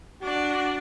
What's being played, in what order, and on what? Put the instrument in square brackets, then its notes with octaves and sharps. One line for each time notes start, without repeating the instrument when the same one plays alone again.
[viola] D4 D5 [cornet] F#4